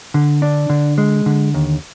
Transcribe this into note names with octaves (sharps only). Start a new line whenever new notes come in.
D3
D4
D3
G#3
D3
D#2